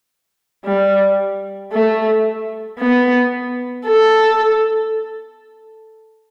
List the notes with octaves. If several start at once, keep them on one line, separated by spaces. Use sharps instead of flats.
G3
A3
B3
A4